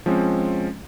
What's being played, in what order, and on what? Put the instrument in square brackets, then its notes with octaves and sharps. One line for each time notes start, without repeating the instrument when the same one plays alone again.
[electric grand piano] F3 G#3 C4 C#4